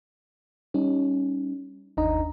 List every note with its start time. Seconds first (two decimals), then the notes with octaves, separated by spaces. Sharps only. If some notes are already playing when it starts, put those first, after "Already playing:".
0.74 G3 C#4 D#4
1.97 G1 D#2 D4 D#4 D#5 A#5